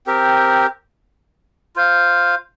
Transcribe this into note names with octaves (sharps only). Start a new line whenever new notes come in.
C4 G4 A#4
F4 C5 F5